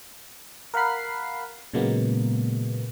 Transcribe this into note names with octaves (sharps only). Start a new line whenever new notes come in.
A#4 F5 F#5 B5 C7
A#2 C#3 F#3 G#3 A#3 B3